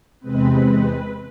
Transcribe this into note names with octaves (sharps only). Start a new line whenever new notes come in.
E2 C3 G#3 C4 B4